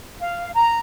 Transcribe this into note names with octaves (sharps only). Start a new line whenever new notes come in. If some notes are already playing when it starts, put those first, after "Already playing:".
F5
A#5